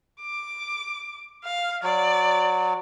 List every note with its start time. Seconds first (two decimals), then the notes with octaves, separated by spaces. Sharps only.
0.21 D6
1.44 F5
1.83 F#3 D5